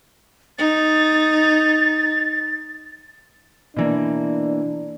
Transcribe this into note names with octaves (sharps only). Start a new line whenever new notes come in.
D#4 A6
B2 E3 A#3 D4